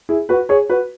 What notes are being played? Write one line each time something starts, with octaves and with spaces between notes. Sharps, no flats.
E4 G#4
F#4 B4
G#4 C#5
F#4 B4